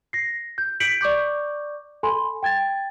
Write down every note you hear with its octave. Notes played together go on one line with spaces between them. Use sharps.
A#6 C7
G6
G6 B6 C#7 D7 F#7
D5 C#6 D6 G6
A4 G#5 B5 C6
G5 G#6 A6